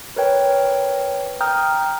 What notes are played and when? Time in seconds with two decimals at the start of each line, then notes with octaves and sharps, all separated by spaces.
0.16 A#4 B4 C#5 G5
1.41 G5 A#5 D#6 F6 G6